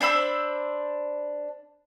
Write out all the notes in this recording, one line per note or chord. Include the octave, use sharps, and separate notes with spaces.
D4 C5 B5 E6